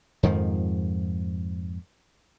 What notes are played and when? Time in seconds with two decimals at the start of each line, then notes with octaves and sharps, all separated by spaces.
0.23 F2 G#2 D#3 F3